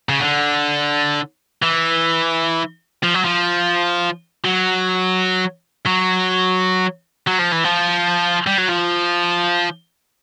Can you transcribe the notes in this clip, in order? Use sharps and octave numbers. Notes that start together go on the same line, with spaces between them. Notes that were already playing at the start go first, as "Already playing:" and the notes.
C#3
D3
E3
F3
F#3
F3
F#3
F#3
F#3
F3
E3
F3
G3
F#3
F3